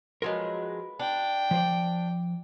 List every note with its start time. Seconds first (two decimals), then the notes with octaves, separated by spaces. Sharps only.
0.22 F3 F#3 G#3 A#4 B4
0.99 D4 G5
1.51 F3 C5 D5